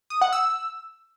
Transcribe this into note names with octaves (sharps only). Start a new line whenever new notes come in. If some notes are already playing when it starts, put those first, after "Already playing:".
D#6
F#5
E6